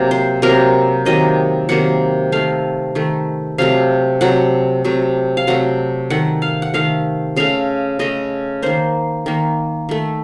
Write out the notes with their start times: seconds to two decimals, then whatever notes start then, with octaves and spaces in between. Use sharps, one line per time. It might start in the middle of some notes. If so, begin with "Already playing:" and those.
Already playing: C3 F#3 A#3
0.11 C5
0.42 C3 F#3 A#3 A#4
1.05 C3 D#3 F#3 A#3 D#5
1.69 C3 D#3 F#3 A#3 F#5
2.32 D#3 A3 F5
2.95 D#3 A3
3.58 C3 F#3 A3 F5
4.21 C3 F#3 A3 F#5
4.84 C3 F#3 A3
5.37 F5
5.47 C3 F#3 A3 F#5
6.10 D#3 A3 F#5
6.42 F5
6.62 F#5
6.74 D#3 A3 F5
7.37 C#3 A3 F5
7.99 C#3 A3 D#5
8.62 D#3 A#3 C5
9.26 D#3 A#3
9.89 D#3 A3